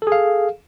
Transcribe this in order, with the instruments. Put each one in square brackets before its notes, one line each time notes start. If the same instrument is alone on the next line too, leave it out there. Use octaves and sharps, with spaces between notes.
[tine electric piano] A4
G#4
F5